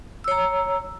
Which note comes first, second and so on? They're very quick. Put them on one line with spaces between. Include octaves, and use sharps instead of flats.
E6 C#5 A#5